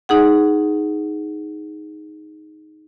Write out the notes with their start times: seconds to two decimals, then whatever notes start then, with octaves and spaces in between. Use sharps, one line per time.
0.09 D#4 G#4 F#5